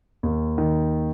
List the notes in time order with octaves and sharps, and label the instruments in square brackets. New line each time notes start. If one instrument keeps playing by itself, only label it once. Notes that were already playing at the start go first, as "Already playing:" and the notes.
[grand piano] D#2
D#3